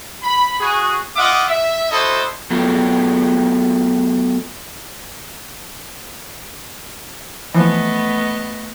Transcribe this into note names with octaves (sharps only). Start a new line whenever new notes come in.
B5
F#4 G#4
F4 D#5 E5 F#5 D6
E5
E4 F#4 A4 C5 D#5
F#3 A3 B3 F4
E3 F3 A3 B3 D#5